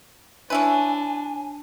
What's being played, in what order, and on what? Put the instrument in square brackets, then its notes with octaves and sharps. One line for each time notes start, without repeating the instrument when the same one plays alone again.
[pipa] C#4 E4 B4 [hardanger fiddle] D4 [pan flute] G#5